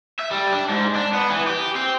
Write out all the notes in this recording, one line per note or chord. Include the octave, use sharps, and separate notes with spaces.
E5
G3
D4
G#2
D4
B3
E3
G4
C4